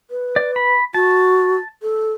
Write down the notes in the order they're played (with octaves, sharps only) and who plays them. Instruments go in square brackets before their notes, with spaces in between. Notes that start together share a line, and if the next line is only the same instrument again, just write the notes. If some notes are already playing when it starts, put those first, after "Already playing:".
[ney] B4
[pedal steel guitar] D5
B5
[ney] F#4 [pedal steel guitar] A5
[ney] A4